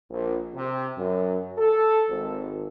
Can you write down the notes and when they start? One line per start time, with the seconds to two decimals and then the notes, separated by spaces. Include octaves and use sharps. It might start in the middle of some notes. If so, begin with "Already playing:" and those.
0.10 A#1
0.55 C3
0.98 F#2
1.58 A4
2.09 G#1